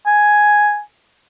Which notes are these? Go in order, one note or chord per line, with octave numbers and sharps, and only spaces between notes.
G#5